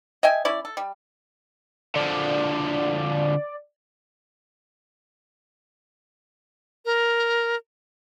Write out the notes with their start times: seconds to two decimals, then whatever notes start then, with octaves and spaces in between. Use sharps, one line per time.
0.23 D#5 E5 G5 G#5
0.45 C#4 E4 D5
0.65 A4
0.77 G3
1.95 D3 F3 D5
6.85 A#4